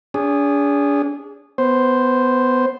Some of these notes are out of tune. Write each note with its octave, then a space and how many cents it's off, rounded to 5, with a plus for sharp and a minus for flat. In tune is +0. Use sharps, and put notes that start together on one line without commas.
D4 -40 G#4 -20
B3 +15 C5 +0